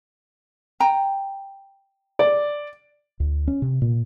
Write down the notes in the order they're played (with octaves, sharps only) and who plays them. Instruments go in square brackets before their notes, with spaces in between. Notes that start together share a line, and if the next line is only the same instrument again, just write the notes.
[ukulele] G5 A#5
[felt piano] D5
[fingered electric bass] D2
C#4
C3
A#2